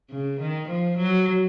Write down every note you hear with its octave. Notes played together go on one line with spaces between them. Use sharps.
C#3
D#3
F3
F#3